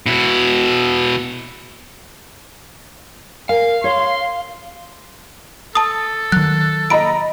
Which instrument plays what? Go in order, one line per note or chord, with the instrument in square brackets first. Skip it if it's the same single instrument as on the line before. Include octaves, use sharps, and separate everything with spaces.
[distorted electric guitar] B2 E4
[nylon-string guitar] A#4 G#5 [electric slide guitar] F5
[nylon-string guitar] C#5 [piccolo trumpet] C6
[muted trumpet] A4 [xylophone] A5 D#6
[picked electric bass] D#3 F#3 [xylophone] F#6
[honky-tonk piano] D#5 A#5 B5 [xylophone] D7